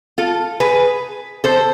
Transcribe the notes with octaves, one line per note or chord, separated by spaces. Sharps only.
F4 A4
G#4 B4
A4 C5